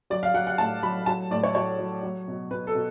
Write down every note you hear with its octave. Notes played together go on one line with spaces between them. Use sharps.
F#3 D5
F5
F#3 F#5
F#5
A2 A5
F#3 B5
F#3 A5
A2 D5
C#5
F#3 C#5
F#3
F#3
B2
B2 B4
A4
B2